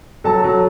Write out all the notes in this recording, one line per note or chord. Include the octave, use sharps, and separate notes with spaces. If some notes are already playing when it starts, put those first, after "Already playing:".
F#3 A4 A5
F#3